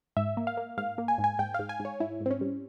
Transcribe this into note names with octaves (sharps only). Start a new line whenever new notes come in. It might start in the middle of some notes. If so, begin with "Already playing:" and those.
G#2 E5
A#3
F5
A#3
G#2 F5
A#3
G#5
G#2
G#5
G#2 G5
G#2 F5
G#5
G#2
C#5
G#2 E4
G#2
C4
C#4
G3